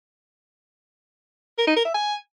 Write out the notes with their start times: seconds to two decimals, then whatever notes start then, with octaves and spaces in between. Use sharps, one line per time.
1.58 A#4
1.67 D#4
1.76 A#4
1.85 E5
1.94 G#5